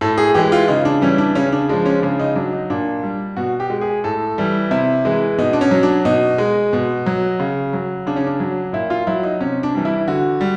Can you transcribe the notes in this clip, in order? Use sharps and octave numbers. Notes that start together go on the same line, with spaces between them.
A2 A4
G#4
E3 G#3 G4
F4
C#3 D#4
D4
E3 G3 C#4
D4
C#3 C#4
D4
F3 G#3 D4
C#4
C#3 D4
D#4
F#3 D4
D#4
A#2 D4
G3
B2 F#4
G4
G#3
G#4
A2 A4
E3 G3
C3 E4
E3 G#3
B2 D#4
D4
C#4
F#3
D4
B2 D#4
G#3
B2
F#3
C#3
F#3
C#3 D4
C#4
D4
F#3
A#2 E4
F4
F#3 E4
D#4
C3 C#4
D4
E3 G3
E4
D3 F#4
G3